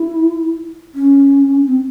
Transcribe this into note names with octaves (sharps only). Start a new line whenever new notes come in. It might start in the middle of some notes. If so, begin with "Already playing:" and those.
Already playing: E4
C#4
C4